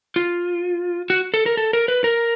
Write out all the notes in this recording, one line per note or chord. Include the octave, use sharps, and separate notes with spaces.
F4
F#4
A4
A#4
A4
A#4
B4
A#4